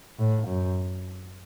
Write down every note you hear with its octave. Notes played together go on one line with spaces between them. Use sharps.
A2
F#2